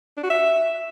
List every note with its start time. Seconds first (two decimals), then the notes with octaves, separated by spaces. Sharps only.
0.17 D4
0.23 F#4
0.30 E5